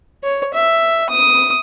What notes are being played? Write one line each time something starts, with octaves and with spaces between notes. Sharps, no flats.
C#5
E5
D#6